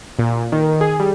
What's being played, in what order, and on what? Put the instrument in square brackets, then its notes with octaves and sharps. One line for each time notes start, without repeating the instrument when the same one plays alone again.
[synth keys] A#2
D#3
G#4
G3